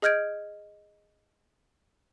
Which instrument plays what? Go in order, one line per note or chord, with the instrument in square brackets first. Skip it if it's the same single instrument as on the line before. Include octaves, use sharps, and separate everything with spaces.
[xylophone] G#4 D#5 F6 G6 G#6 D7